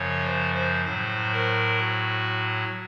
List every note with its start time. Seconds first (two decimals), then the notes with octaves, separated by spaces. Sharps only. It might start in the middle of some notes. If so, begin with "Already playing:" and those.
Already playing: F#2 C#3 F3 C#5
0.25 C5
0.55 C5
0.85 A2 F#3 C5
1.32 A#4
1.77 F#4